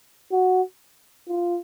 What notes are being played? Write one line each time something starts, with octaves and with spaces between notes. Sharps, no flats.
F#4
F4